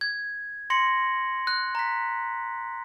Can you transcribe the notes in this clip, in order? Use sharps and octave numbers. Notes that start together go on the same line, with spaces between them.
G#6
C6 A#6 C#7 F#7
F#6
A#5 B6